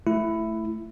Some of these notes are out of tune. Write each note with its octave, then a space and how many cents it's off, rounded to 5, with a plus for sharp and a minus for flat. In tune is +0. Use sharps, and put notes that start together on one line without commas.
A3 +0 E4 +10